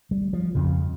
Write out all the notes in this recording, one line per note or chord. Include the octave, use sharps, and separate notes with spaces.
G3
F3
F2 C#3